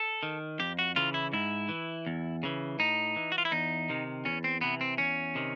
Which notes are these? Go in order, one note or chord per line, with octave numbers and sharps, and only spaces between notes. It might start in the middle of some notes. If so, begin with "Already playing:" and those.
Already playing: A4
D#3
F2 G4
F#4
C#3 E3 F4
E4
G#2 E4
E3
E2
C#3 E3
A2 D#4
E3
F#4
F4
E4
E2 D#4
C3 D#3
E2 C#4
C4
C3 E3 B3
C4
E2 C#4
C3 D#3